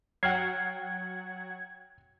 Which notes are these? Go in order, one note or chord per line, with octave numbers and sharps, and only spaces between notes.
F#3 F#5 G5 F6 G#6 C7